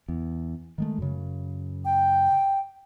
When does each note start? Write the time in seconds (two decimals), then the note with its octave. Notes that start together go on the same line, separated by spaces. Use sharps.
0.08 E2
0.78 D#3 G#3 A3
0.98 F#2 C#3
1.85 G5